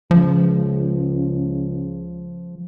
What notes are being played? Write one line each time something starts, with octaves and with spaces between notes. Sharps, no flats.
C#2 F3